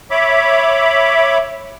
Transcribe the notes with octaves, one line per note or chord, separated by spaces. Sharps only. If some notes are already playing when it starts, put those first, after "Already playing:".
C#5 E5 B5 D6